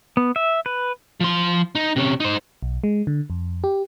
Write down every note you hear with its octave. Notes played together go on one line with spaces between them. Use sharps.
B3
E5
B4
F3 C6
D#4
C3 C#4
D#4 C5
B1
G#3
D3
F2
G4